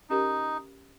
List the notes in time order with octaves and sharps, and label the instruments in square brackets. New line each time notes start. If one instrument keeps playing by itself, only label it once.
[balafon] C#4 G4 A#4 [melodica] D#4